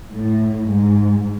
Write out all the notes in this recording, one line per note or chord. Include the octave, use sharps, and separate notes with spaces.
A2
G#2